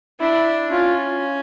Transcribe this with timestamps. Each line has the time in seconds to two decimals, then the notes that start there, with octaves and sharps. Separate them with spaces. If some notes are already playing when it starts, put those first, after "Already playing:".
0.20 D4 E4
0.71 C#4 F4